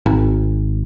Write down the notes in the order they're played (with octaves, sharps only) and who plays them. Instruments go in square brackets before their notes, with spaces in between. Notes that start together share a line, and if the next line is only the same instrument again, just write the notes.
[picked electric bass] G#1